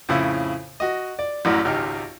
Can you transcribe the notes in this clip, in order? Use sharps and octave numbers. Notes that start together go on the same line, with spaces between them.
F2 A2 C#3 E4
F#4 D#5
D5
A1 F#2 A2 F#4 D5 F6
G#1 C#2 D#4 G4 F6